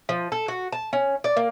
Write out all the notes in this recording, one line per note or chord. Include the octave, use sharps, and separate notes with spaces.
F3
A4
F#4
A5
C#4
D5
A#3